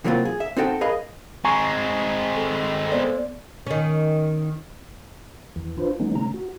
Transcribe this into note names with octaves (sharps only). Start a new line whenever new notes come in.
C3 E3 F#3 A#3 C4 F4
G#4
E5
C4 D#4 F#4 A4 D#5 G5
G#4 A#4 B4 D#5 F5
G#3 C4 G#5 A#5 C#6
A4
B3 C5 D5
D#3 C#4
E2 E3
D4 F4 B4 C5
E3 G3 A3 B3 C#4 D#4
C#3 A3 C#4 A#5
F#4